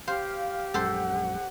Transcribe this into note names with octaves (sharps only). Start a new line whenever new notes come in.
G4 C5 F5
A#1 F#2 G#3 A4 C5 F#5